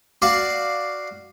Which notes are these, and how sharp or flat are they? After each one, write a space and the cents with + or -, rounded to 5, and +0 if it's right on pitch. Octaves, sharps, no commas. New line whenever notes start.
F#4 +0 D5 +0 F5 +0